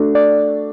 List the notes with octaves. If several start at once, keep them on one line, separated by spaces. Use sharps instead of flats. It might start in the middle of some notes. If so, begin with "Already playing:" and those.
Already playing: A3 D4 F#4
D5